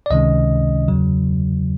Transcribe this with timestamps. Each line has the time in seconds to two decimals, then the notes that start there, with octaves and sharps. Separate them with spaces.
0.06 D5
0.10 C#2 C3 D#3 G#3 C#4 D#5
0.88 E2 C#3 F#3